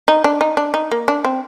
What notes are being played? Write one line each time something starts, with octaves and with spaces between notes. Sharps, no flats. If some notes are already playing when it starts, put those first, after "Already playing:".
D#4
D4
D#4
D4
D#4
A#3
D4
C4